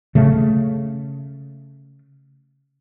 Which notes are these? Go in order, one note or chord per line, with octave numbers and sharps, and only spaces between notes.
C#3 A3